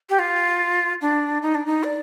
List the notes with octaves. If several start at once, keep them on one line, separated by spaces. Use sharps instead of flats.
G4
F4
D4
D#4
D4
D#4
D5